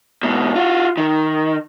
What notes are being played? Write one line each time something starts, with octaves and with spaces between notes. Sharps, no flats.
G#2 B2
F4 F#4
D#3